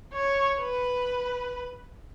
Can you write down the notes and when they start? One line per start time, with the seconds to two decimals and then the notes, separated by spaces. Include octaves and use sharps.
0.13 C#5
0.60 B4